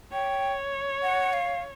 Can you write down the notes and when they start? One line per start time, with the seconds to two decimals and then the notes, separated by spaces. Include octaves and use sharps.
0.12 C#5 G5
1.03 F#5
1.33 F5